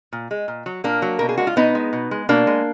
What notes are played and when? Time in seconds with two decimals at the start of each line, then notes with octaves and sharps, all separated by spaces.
0.13 A#2
0.31 G#3
0.48 A#2
0.66 F#3
0.84 A#2 A#3 D4
1.02 F#3
1.19 B2 A#4
1.29 G#4
1.37 G#3 F#4
1.47 F4
1.56 B2 B3 D#4
1.75 G#3
1.93 B2
2.11 G#3
2.29 B2 A#3 D4
2.47 G#3